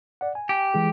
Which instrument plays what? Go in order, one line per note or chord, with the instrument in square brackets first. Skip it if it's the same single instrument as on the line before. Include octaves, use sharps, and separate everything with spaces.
[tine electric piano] D5 F#5
G#5
[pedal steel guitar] G4
[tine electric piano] E3 G#3 G#4